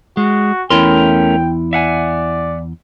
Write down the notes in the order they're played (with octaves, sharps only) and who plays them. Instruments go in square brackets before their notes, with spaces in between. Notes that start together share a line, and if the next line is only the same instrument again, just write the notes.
[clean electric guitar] G#3 [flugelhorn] F#4
[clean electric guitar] E2 E4 C6 [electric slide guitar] A3 C#4 A#4 [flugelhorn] G5
[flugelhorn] D5 [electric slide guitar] E5 F#5 G#5